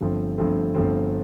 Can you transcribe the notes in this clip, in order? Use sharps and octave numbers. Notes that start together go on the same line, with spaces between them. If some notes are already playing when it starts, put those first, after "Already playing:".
G1 G2 F3 A3 C4
G1 G2 F3 A3 C4
G1 G2 F3 A3 C4